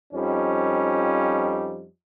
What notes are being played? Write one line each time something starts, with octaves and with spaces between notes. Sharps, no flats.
F2 F3 G3 C#4 D#4